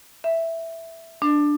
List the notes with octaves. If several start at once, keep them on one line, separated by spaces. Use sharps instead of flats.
E5
D4